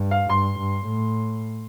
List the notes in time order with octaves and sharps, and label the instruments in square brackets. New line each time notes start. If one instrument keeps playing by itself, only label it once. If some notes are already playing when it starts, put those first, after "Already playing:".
Already playing: [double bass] G2
[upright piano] F5
[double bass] G2 [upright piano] C6
[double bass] G2
A2